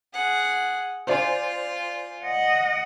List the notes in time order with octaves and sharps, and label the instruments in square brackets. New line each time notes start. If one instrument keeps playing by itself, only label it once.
[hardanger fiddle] G#4 F#5
[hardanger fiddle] F4 [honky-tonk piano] C5 D5 G#5
[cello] D#5 F#5